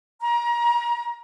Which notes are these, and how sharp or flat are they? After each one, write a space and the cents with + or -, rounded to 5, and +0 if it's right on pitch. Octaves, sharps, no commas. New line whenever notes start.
A#5 +30